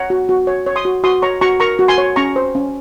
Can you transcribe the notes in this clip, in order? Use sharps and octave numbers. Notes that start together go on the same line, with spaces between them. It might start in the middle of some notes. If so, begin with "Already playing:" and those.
Already playing: C#5 F#5 A#5
F#4
F#4
C#5
C#5
C6 D#6
F#4
F#4 C6 D#6
C#5 A#5 C#6
F#4 A#5 C#6
A#4 A#5 C#6
F#4
G#5 C6
C#5
C#4 A#5 C#6
C5
C#4